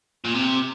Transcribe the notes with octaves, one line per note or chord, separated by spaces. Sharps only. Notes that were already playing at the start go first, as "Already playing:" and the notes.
A#2
C3